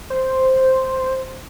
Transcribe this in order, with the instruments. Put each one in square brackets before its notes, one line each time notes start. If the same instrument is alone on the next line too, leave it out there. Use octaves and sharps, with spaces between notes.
[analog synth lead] C5